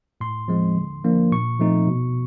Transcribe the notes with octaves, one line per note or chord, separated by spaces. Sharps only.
A2 C6
F3 G#3 C4
D3
F3 A#3 D4
A#2 C#6
F3 A3 C4 D#4
B2